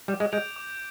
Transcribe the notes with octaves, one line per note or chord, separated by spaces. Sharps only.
G3 D6
G#3
G#3 G6 D7 F7
D6